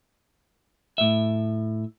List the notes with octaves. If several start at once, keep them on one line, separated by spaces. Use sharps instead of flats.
A2 E5